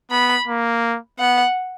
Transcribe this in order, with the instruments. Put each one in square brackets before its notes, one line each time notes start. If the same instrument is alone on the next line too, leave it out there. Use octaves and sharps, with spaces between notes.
[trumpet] B3 [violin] B5
[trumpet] A#3
[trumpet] B3 [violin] F#5